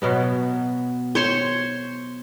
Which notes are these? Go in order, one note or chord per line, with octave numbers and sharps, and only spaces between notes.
B2 F#3 B3
C5 C#5 C6